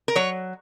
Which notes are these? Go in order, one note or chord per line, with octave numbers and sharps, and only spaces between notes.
A#4
F#3 C#5